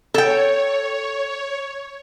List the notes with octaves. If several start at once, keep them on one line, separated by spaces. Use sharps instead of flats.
A4 C#5 G5